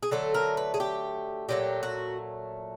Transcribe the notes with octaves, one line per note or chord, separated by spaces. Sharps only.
G#4
D3 F#3 A3 A4
A#4
B4
G#4
G4
A#2 F#3 A3 G4
F#4